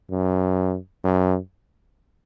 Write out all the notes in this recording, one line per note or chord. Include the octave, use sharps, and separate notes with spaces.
F#2
F#2